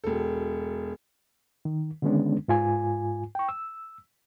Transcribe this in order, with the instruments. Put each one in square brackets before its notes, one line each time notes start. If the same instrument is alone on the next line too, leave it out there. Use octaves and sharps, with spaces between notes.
[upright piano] E1 A4
[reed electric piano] D#3
D3 D#3 G#3 B3 C#4 D4
G#2 F4 G#5
G5 C#6
E6